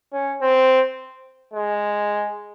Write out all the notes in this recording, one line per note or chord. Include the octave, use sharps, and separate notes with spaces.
C#4
C4
G#3